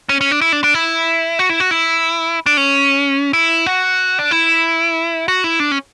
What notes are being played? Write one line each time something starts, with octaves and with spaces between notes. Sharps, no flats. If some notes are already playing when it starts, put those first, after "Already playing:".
C#4
C#4
D4
E4
D4
D4
E4
F#4
E4
F#4
E4
D4
C#4
E4
F#4
D4
E4
F#4
E4
D4
C#4